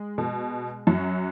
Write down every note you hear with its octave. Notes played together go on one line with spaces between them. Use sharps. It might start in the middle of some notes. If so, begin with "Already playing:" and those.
Already playing: G#3
B2
F#2 F#3